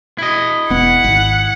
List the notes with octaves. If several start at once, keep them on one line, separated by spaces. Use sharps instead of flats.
E4 D#5
E1 B3 F#5
G#1